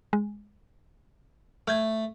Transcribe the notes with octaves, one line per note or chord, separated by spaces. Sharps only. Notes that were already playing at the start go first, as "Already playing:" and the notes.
G#3
A3 F6 G6 G#6